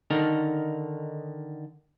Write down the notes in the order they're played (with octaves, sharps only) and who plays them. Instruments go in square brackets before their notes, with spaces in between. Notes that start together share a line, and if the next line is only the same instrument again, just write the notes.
[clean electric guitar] D3 D#3 D#4 A4 A#4